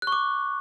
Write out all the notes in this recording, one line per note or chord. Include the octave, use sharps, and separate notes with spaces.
F#6
C#6
D6